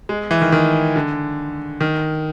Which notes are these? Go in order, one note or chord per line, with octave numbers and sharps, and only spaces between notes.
G#3
E3
D#3
D#3
D3
D#3